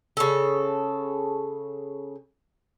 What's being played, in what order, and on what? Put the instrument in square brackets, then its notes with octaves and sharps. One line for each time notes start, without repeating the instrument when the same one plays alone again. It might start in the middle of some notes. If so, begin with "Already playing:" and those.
[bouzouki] C#3 A4